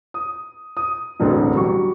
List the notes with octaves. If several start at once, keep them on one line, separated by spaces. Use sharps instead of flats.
D#6
D#6
E1 A1 D2 C4
F#3 G3 C#6